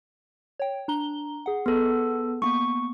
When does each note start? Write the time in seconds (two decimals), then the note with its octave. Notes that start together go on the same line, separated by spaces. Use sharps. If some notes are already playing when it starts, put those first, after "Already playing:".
0.60 C#5 G5
0.88 D4 A#5 G7
1.46 G#4 F#5
1.66 B3 A4
2.42 A#3 B3 C#6